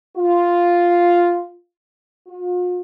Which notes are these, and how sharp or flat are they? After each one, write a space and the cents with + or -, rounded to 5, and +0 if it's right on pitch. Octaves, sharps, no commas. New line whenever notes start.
F4 +0
F4 +45